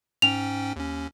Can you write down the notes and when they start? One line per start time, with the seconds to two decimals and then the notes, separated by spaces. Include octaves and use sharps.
0.22 G#2 C#4 G5 F7
0.76 D#2 C#4